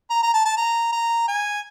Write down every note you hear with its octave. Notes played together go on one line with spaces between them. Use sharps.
A#5
A#5
A5
A5
A#5
A#5
G#5